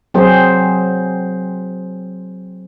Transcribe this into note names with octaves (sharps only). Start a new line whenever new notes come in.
F#3 C4 G#4 C5